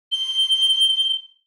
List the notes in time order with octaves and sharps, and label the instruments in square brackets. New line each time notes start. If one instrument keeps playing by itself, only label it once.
[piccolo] G7